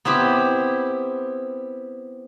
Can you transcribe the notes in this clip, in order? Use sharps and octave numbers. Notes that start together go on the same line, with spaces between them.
B3 C4 E4 G4